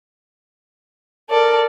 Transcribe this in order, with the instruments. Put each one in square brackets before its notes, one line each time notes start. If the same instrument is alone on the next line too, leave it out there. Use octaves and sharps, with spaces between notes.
[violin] A4 D5 [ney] A#4